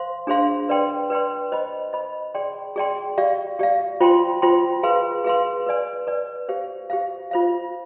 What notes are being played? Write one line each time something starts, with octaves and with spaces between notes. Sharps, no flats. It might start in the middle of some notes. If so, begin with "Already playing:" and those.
Already playing: C5 F5 C6
D4 G#4 C5 F5 C6
B4 D5 G5 C6
B4 D5 G5 C6
C5 D#5 B5
C5 D#5 B5
G#4 D5 G5 C6
G#4 D5 G5 C6
G4 D5 F5
G4 D5 F5
F4 C5 G5 C6
F4 C5 G5 C6
G#4 B4 F5 C6
G#4 B4 F5 C6
B4 D5 G#5
B4 D5 G#5
G4 C5 F5
G4 C5 F5
F4 C5 F5